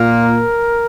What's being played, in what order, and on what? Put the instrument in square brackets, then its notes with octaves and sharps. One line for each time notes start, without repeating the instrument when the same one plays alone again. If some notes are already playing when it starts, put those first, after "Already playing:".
Already playing: [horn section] A#2 A#3 A#4